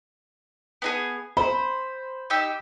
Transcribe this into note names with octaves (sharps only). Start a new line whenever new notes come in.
B3 D#4 G#4
C5 B5
D#4 G4 E6